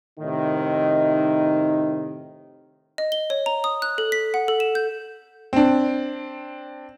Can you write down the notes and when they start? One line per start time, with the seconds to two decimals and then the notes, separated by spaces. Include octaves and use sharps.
0.19 A2 C3 D#3 D#4
2.98 D#5
3.12 G7
3.30 C#5
3.46 A#5
3.64 D#6
3.82 F#6
3.98 A4
4.12 B6
4.34 F#5
4.48 A4
4.60 E7
4.75 G6
5.53 C4 D4